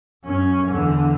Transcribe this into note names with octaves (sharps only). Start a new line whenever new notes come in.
F#2 C#4
E2 D3